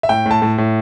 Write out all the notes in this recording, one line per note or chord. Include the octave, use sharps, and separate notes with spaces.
E5
A2 G5
A2 A5
A2
A2